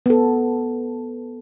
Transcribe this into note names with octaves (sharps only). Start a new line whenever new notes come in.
B3 A4